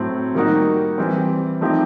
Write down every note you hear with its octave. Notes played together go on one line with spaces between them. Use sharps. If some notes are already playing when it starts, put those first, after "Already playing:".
Already playing: A2 F#3 A3 C4
D#3 G3 A#3 D#4 F#4
E3 G3 C4
F3 A3 C4 D#4 G4